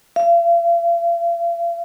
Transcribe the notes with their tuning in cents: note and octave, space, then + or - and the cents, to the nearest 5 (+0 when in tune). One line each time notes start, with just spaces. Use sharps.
F5 -45